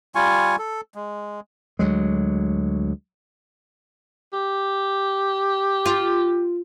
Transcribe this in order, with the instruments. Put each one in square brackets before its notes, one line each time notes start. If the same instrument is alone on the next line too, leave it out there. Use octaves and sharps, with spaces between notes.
[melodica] G3 F4 G#5 C#6
A4
G#3
[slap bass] D2 F#3 G#3
[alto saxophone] G4
[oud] F4